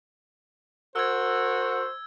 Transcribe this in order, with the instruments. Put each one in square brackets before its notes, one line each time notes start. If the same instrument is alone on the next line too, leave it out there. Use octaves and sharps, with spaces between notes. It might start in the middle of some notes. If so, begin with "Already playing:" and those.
[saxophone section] F#4 A#4 [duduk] C5 [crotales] E6 G#6